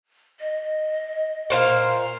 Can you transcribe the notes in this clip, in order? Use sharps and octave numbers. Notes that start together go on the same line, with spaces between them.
D#5
A#2 C5 F5